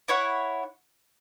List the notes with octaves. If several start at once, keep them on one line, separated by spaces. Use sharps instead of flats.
E4 C#5 F#5